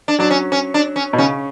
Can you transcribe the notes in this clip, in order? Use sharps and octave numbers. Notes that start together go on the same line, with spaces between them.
D4
F#3 D4
C#4
C#4
D4
C#4
B2
C#3 C#4